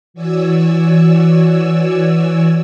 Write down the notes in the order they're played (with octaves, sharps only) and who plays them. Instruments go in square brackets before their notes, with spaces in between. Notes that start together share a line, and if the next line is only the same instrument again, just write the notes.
[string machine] E3 F#4 C#5 D5 G#5 E6